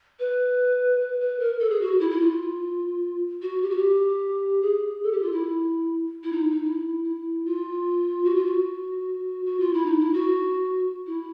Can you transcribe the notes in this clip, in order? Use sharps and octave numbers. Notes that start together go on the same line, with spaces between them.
B4
B4
B4
A#4
A4
G#4
F#4
E4
E4
F4
F#4
G4
F#4
G4
G#4
A4
G4
F4
E4
E4
D#4
D#4
E4
E4
F4
F#4
F4
F#4
F#4
F4
E4
D#4
E4
F#4
E4